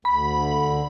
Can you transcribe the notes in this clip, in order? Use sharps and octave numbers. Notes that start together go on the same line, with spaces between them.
D2 B5
D3
D2